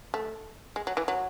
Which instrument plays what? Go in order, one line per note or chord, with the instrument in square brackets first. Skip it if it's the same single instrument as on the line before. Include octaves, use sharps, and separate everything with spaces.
[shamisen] A3
G#3
F#3
E3
F#3